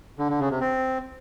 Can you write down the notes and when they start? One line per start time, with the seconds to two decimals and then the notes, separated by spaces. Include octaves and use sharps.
0.19 D3
0.29 D3
0.40 C#3
0.50 C3
0.61 C4